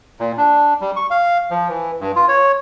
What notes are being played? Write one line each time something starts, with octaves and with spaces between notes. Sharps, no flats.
A#2
D4
G3
C#6
F5
F3
E3
G2
F4
C#5